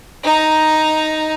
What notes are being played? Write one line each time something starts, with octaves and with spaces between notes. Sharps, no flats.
D#4 A#5